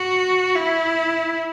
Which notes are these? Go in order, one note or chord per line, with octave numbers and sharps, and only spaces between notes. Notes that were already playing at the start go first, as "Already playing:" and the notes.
Already playing: F#4
E4